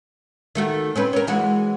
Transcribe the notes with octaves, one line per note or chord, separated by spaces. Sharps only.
D#3 A3 F#4
C4 C#4 B4
C#4 A#4
E3 G#3 F#4